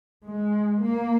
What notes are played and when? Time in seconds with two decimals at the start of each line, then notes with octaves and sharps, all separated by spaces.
0.25 G#3
0.82 A#3